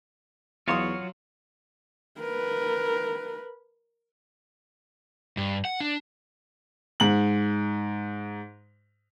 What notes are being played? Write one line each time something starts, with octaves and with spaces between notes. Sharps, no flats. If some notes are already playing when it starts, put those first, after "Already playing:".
E2 F#3 F4 F#4 C#5 F5 C6 D#6
A#4 B4
G2
F#5
D4
G#2 F#7